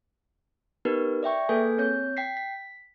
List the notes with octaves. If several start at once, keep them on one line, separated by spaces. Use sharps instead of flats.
B3 D#4 G4 A#4 B4
D5 E5 G5 C#6
A#3 G#4 A4 B4 G#5 G6
C4 C#5 G6
G5 B6 C7
B6